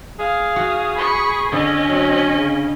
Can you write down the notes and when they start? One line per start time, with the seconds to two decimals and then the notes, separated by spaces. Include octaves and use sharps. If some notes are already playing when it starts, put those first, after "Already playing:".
0.19 G#4 F5
0.56 F#4
0.97 B5 C#6
1.52 D3 C#4 D#5
1.88 F#3
2.37 C#3